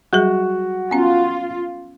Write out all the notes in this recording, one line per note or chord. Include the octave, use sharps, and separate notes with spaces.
F#3 G3 F#4 G#4 F#5
B3 C#4 F4